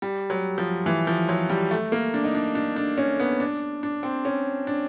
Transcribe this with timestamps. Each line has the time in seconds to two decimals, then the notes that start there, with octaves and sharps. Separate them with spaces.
0.02 G3
0.30 F#3
0.58 F3
0.86 E3
1.07 F3
1.29 F#3
1.50 G3
1.71 A3
1.92 A#3
2.14 D4
2.24 D#4
2.35 D4
2.55 D4
2.76 D4
2.98 C#4
3.20 B3
3.40 D4
3.83 D4
4.03 C4
4.25 C#4
4.67 D4